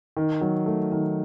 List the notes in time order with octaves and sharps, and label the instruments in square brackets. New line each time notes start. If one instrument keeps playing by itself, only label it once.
[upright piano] D#3
F#3
A3
D#3